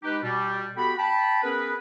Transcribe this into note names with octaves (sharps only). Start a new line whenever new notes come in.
G#3 D#4 G4 B4
B2 G3
B3 F#4 G4 A4 G5 B5
G5 A5 B5
B3 C#4 G#4 A#4 B4